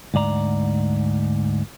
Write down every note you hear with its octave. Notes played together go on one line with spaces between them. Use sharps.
D2 G#2 D5 A#5